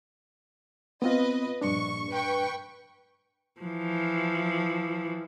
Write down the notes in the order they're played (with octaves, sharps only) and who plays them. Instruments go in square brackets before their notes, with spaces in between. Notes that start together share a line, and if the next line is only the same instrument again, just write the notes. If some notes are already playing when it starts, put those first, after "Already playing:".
[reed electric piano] B3 C4 F4 [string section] B4 D#5
[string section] A#1 C#6 [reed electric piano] G2 D4
[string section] B4 G5 C#6
[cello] E3 F3